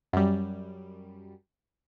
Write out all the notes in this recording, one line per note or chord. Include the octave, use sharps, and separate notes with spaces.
F#2 G3